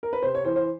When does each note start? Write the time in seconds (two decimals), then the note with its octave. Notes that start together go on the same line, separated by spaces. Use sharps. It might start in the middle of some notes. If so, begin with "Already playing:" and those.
0.03 A#4
0.13 B4
0.22 C3 C5
0.35 C#5
0.44 E3 C5
0.56 C5